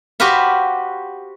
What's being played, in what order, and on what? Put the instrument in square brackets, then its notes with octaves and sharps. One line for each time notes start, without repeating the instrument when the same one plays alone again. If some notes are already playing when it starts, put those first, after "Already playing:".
[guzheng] F#4 G4 B4 C5 F5